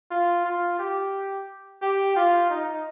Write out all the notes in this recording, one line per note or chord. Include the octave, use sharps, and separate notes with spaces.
F4
F4
G4
G4
F4
D#4